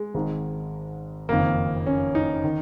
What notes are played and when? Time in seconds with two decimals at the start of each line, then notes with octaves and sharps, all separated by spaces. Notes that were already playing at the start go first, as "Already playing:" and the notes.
Already playing: G#3
0.14 G#1 G#2 D#3
1.29 F#1 F2 D#3 A#3
1.87 C#4
2.15 D#4
2.44 D#3